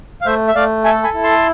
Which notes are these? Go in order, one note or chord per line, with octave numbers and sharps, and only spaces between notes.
F5
A3 C5 E5
E5
A3 D5 F5
A4 E5 G#5
G#5 B5
E4
A5 C6